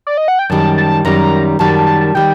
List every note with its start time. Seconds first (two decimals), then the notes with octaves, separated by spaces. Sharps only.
0.07 D5
0.18 D#5
0.28 F#5
0.39 G5
0.50 F#2 D#3 G3 A5
0.78 A5
1.05 F#2 D#3 G3 A#5
1.59 F#2 D#3 G3 A5
1.73 A5
1.87 A5
2.01 A5
2.15 D#3 G3 G5